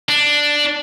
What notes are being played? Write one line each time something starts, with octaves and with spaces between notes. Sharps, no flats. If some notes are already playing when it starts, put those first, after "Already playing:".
D4